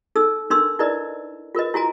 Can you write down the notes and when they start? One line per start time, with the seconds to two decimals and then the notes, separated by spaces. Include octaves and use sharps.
0.16 D#4 A4 E6
0.50 D4 D#4 A#4 C6 E6
0.79 D#4 E4 A#4 B4 D5 D#5
1.55 F4 A#4 B4 D#5
1.74 E4 F#4 G#5 A#5